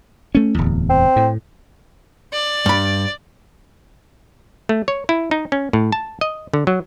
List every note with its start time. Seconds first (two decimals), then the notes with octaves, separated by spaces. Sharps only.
0.35 A3 C#4
0.54 D1 E2
0.89 C4
1.16 A2
2.33 D5
2.66 G2 B5
4.69 A3
4.88 C#5
5.09 E4
5.31 D#4
5.52 C#4
5.73 A2
5.92 A5
6.21 D#5
6.54 D3
6.67 F#3